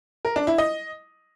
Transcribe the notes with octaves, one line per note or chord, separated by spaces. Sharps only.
A#4
D4
E4
D#5